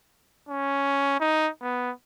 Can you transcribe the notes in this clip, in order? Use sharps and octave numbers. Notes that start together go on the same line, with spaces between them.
C#4
D#4
B3